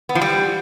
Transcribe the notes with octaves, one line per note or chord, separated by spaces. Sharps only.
B3
F3
G3